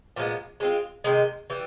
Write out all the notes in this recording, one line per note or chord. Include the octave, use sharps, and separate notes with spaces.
A#2 F3 G#3 B3
G#3 C4 F4
C3 D#3 G#3
E3 G3